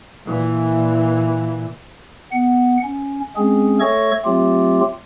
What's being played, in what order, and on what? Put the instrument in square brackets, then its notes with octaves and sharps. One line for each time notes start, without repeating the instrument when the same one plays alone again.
[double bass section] A#2 E3
[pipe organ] B3 F#5
C#4
G#3 C4 C#4 G#4
A3 A4 C#5 C#6 A#6
F#3 A3 C4 F4 G4